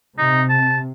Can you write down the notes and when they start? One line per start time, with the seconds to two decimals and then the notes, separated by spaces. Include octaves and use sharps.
0.18 C3 D#4
0.49 A5